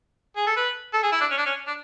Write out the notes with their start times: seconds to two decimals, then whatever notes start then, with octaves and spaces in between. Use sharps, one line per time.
0.37 G#4
0.47 A4
0.57 B4
0.94 A4
1.03 G#4
1.12 E4
1.21 D4
1.31 C#4
1.38 D4
1.46 C#4
1.67 D4